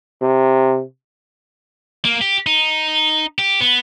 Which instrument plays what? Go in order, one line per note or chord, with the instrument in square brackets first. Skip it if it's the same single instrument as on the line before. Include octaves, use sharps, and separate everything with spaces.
[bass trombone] C3
[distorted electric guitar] A#3
G4
D#4
G4
B3